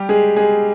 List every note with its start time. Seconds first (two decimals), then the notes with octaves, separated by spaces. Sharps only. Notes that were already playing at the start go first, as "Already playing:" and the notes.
Already playing: G3 G4
0.09 G#3 G#4
0.36 G#3 G#4